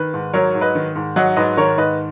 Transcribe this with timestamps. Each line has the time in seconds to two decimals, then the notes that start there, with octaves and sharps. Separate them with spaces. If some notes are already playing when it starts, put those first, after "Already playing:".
Already playing: D#3 B4
0.14 G#2
0.34 F#3 A#4 C#5
0.55 G#2
0.61 B4 D#5
0.75 D#3
0.96 G#2
1.16 F#3 D#5 F#5
1.36 G#2 B4 D#5
1.57 D#3 A#4 C#5
1.77 G#2 B4 D#5